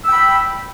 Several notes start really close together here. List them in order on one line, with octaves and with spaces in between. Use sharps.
E6 G5 B5